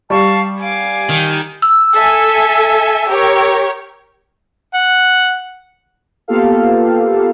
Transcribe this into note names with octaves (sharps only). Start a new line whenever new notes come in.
G3 F5 A5 C#6
F5 G#5 D6
D#3
E6
A4 E5 G#5
G4 A#4 C#5
F#5
A#3 B3 F4 G4 A4 F5